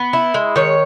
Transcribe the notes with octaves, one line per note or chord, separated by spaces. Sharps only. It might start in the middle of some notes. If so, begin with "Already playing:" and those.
Already playing: B3
E4
G#3
D#3 C#5